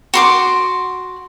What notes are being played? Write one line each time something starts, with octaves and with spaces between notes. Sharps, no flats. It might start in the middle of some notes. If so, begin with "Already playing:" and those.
F#4 C6 D6